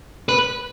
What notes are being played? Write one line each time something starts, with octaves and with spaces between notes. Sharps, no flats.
B4